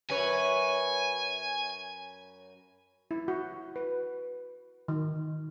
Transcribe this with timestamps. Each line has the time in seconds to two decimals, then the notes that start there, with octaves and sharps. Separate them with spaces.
0.10 F#2 B4 C#5 G#5
3.11 E4
3.28 F#4
3.76 B4
4.88 D#3